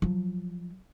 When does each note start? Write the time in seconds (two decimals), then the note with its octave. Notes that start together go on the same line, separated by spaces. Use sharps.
0.02 F3 F#3